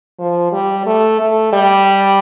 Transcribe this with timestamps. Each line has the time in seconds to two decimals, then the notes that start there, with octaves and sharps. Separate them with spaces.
0.19 F3
0.53 G3
0.86 A3
1.20 A3
1.53 G3